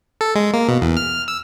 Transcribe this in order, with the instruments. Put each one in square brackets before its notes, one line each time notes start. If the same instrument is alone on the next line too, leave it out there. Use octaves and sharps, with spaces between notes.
[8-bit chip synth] A4
G#3
A#3
B2
E2
F6
E6